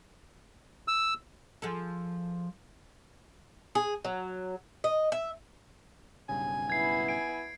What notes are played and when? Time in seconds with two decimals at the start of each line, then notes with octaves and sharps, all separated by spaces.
0.88 E6
1.62 F3 G#4 A4
3.75 G#4
4.05 F#3
4.84 D#5
5.12 E5
6.29 B1 G2 C#3 G#5
6.70 B3 E4 G#6 C7
7.08 G#5 D7